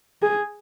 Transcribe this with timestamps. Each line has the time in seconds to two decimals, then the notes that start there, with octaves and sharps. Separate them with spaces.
0.23 G#4